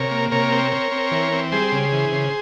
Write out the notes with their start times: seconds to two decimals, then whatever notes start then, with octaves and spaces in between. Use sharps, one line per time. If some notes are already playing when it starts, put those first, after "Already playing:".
Already playing: C3 A#4 C#5
0.11 A#3
0.31 C3 A#4 C#5
0.52 C4
0.72 C4
0.92 C4
1.12 E3
1.32 C4
1.52 G3 G#4 C5
1.72 C#3
1.92 E3
2.12 C#3